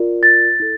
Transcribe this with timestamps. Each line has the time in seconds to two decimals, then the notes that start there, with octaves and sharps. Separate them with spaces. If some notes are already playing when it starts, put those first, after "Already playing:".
Already playing: F4 A#4 D5
0.23 A6
0.60 E4 A4